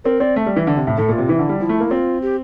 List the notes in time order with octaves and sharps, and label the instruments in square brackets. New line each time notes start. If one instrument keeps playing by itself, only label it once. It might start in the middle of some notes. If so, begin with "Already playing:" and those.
[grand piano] C4 [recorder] A#4
[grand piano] C4 [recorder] D5
[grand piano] A3
G3
E3
D3
C3
A2
[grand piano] A2 [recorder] A4
[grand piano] A#2 [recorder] F4
[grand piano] C3
[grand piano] E3 [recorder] E4
[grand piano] D3
G3
[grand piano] F3 [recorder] E4
[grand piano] A3
A#3
[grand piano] C4 [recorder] F4
[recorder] G4